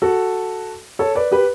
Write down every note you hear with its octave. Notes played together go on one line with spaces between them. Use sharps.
F#4 A4
A4 C#5
B4 D5
G4 B4